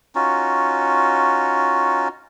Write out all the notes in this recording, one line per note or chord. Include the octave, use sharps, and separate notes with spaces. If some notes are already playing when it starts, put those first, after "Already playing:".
C#4 D#4 F4 F#4